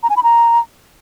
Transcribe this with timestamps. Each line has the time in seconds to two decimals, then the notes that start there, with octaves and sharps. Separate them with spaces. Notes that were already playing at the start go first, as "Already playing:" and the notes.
0.03 A#5
0.10 G#5
0.17 B5
0.23 A#5